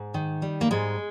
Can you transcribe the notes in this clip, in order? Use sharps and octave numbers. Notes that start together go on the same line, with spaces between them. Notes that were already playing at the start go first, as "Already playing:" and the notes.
Already playing: G#2
D#3
G3
A#3
G#2 G#3